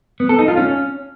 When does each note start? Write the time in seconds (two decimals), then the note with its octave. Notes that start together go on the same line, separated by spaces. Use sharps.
0.20 B3
0.29 A4
0.39 D#4
0.48 F4
0.57 C#4